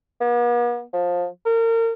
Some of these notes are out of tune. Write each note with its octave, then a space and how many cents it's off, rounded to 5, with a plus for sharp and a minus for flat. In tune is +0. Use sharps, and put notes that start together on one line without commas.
B3 -45
F3 +20
A#4 -35